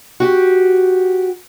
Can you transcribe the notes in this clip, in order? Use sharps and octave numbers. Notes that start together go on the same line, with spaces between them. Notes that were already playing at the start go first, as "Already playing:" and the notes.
F#4 G4